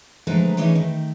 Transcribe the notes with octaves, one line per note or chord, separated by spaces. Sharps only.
D3 F3 G#3 A3 B4 A#5
E3 A3 C#4 D#4 G#4 B4
D#3 A3